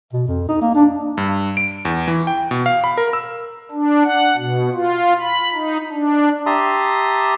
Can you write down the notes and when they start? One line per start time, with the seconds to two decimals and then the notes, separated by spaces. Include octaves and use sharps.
0.13 B2
0.28 F2
0.49 D#4
0.62 A#3
0.75 D4
1.17 G2
1.57 D7
1.85 E2
2.08 E3
2.27 G5
2.51 B2
2.66 F5
2.84 B5
2.97 A#4
3.13 E6
3.71 D4
4.04 F#5
4.37 B2
4.73 F4
5.21 B5
5.54 D#4
5.91 D4
6.46 G4 E5 A5 A#5 C6 D#6